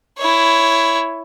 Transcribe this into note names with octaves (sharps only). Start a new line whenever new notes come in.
E4 C#5